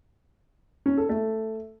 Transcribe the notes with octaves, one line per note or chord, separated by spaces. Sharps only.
C#4
A4
A3